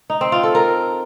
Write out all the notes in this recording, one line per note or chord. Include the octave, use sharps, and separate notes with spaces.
D#4
C4
F4
A4
A#4